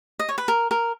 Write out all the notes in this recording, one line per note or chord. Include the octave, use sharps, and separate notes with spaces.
D#5
C#5
B4
A#4
A#4